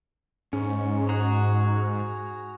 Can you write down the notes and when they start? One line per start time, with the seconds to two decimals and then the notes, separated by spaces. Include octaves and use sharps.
0.53 G#2 C#4
1.09 F#4 G#4 A#5